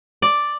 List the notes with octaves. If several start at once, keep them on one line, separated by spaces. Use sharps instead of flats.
D5